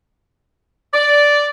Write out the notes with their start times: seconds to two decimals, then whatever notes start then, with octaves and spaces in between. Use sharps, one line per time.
0.94 D5